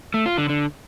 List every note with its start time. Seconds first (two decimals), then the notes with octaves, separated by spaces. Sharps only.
0.14 A3
0.26 F4
0.37 D3
0.49 D3